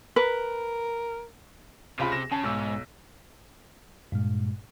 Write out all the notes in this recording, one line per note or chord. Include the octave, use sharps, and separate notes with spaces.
A#4 B4
C#2 C3 F4 B5
A#6 E7
C#3 A5
B1 G#2 E6
G2 A#2 G#3